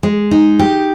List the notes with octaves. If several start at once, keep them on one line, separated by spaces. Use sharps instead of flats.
G#3
D#4
G4